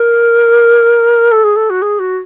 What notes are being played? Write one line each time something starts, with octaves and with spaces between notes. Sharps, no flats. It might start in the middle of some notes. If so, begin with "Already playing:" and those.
Already playing: A#4
A4
G#4
A4
F#4
G#4
F#4